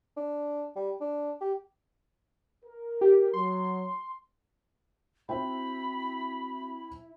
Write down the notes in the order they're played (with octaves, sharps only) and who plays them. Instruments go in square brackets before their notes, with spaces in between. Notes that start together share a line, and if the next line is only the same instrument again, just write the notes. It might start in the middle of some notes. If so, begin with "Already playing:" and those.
[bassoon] D4
G3
D4
G4
[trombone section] A#4
[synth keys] G4
[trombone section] F#3 [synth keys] C6
[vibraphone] C4 F#4 [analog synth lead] E4 [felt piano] C5 E5 G5 [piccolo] B5